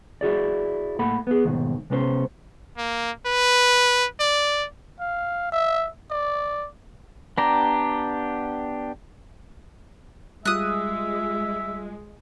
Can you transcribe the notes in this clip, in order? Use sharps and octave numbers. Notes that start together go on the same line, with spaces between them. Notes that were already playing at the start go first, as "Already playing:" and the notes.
E4 F#4 G#4 D5
A2 A#3 A4 F#5 B5
B3 G#4
D#2 G#2 B2 D#3
C3 G#3 B3 C#4 A4 C5
A#3
B4
D5
F5
E5
D5
B3 D4 G4 A#5
G3 G#3 F4 E5 D#6 F#6